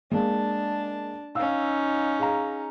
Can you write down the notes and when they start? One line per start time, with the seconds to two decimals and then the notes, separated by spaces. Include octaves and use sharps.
0.11 G#3 A#3 D4 A5
1.35 C#4 D#4 F5 E6
2.19 G#4 F5 A#5